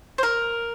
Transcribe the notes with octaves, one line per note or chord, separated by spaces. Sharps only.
C5
A#4